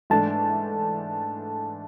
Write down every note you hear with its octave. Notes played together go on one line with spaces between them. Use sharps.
G#2 E3 A3 D4 A5